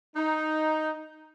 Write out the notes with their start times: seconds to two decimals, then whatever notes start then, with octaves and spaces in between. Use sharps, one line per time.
0.16 D#4